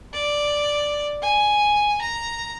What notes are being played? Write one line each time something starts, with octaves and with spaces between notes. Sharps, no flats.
D5
G#5
A#5